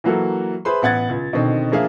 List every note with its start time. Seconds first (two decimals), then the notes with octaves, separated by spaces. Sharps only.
0.04 E3 F#3 A#3 F#4 A4
0.65 G#4 B4 C5 E5 B5 C6
0.82 A1 B3 F#5 G#6 A6
1.09 C#2
1.33 B2 D3 D#3 C4 D#4
1.72 F3 A#3 D4 G#4 E5 F5